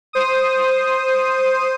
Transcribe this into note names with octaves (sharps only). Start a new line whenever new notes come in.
C5 D#6